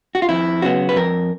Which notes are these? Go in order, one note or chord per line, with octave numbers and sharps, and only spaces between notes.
F#4
F4
F2 E4
C#3 F#3 B3 F#4
B4
F2 A#4